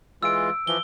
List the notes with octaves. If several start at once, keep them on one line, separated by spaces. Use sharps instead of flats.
E3 G#3 F4 E6 D7
E3 F3 G7